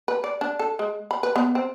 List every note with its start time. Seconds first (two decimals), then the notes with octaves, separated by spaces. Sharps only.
0.08 B4
0.24 D5
0.41 D4
0.59 A4
0.79 G#3
1.11 B5
1.23 B4
1.36 B3
1.55 C4